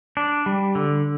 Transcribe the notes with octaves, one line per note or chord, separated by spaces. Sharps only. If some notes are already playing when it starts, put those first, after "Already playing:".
D4
G3
D3